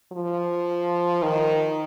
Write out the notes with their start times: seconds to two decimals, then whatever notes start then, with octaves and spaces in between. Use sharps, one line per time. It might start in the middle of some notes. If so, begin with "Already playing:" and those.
0.12 F3
1.23 D#3